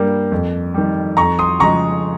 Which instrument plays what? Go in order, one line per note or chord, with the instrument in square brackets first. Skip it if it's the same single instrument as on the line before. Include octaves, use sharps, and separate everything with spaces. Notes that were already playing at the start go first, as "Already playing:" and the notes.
Already playing: [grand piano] G2 G3 A#3
F2
D#3 G3
F2 A#5 C#6
C6 D#6
C#3 F3 G#3 A#5 C#6